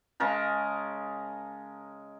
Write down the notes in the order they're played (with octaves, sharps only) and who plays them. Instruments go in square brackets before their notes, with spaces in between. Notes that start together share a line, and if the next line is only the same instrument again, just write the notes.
[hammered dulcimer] C#3 G#3 A#4 A5